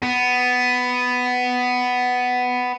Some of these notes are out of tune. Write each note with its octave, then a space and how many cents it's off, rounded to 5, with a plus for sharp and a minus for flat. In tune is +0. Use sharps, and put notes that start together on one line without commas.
B3 +10